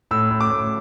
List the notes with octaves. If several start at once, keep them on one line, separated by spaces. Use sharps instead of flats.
A2 E6
A2
D6
A2